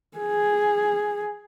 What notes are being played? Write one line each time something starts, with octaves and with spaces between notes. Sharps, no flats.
G#4